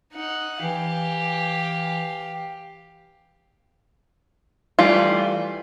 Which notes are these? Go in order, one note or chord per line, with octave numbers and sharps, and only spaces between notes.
D#4 F#5
E3 G4 F5
E3 G3 A3 F4